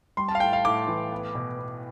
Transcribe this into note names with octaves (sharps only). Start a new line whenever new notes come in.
G3 C6
A5
F5
A2 G5
F5
A2 D6
E3
B3
B2
B3